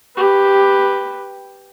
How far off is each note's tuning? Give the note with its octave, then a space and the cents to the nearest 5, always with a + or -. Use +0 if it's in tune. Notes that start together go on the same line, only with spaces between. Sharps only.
G4 +5 B4 +0